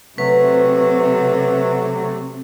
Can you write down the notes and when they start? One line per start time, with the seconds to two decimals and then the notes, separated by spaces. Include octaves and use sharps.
0.18 C3 F#3 A3 B4